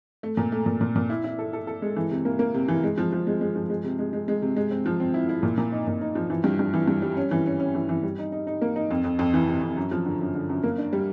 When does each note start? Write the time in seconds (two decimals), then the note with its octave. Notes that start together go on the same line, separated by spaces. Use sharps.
0.23 A3
0.37 A#2
0.52 A3
0.66 A#2
0.81 A#2
0.96 A#2
1.10 E4
1.24 E4
1.39 A4
1.53 A4
1.67 A4
1.82 G#3
1.96 E3
2.11 C3
2.25 A#3
2.39 A#3
2.54 C3
2.68 E3
2.84 G#3
2.98 F3
3.13 F3
3.27 G#3
3.41 G#3
3.55 F3
3.70 G#3
3.84 C3
3.99 G#3
4.13 G#3
4.28 G#3
4.42 C3
4.56 G#3
4.71 C4
4.86 F3
5.00 C4
5.14 E4
5.29 E4
5.43 A#2
5.58 A#2
5.72 D#4
5.87 A#2
6.01 D#4
6.15 F3
6.30 E3
6.44 G2
6.59 G2
6.74 E3
6.88 G2
7.02 G3
7.17 C#4
7.31 E3
7.46 C#4
7.60 C#4
7.75 E3
7.89 E3
8.03 G3
8.19 D#4
8.32 D#4
8.47 D#4
8.62 A#3
8.76 D#4
8.91 F2
9.04 F2
9.19 F2
9.34 E3
9.48 C3
9.62 F2
9.77 F#2
9.91 F3
10.06 D3
10.21 F#2
10.35 D3
10.50 F#2
10.64 A#3
10.78 D4
10.93 G3